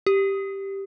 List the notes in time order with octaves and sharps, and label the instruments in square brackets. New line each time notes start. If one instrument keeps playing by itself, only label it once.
[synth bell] G4